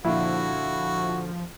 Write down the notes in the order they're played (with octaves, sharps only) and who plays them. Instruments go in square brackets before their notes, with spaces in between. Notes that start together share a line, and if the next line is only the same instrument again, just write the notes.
[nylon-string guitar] A#2 D3 [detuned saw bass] F3 [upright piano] E4 F5 [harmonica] F#4